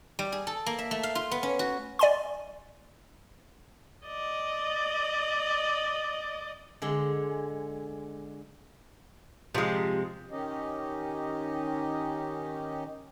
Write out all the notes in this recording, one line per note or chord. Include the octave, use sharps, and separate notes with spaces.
G3
G#4
A4
A#3
E5
A3
F5
F4
B3
C#4
F#4
D5 G#5 C6
D5 D#5
D3 G#3
C3 F3 G#3 F4
D#3 C#4 D#4 G4 D#5